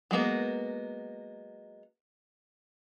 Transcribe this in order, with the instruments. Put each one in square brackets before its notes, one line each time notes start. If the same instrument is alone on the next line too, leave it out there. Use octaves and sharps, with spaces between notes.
[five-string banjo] F#3 G#3 A#3 B3